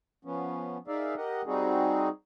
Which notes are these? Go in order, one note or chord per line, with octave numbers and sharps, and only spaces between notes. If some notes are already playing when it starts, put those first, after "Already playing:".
F3 B3 C#4
D#4 G#4 A#4 D5 E5 F5
G4 A#4 D#5 F#5
G3 C4 D#4 F#4 G#4